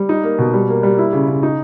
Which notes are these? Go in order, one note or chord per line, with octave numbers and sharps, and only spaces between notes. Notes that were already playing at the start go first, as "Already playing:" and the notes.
Already playing: G3
D#4
A#3
B2
G3
A#3
G3
E4
C#3
C#3
D#4